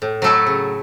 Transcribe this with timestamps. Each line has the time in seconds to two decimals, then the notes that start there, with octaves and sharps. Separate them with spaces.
0.02 A2
0.22 F#3 A3 E4 A4
0.47 C#3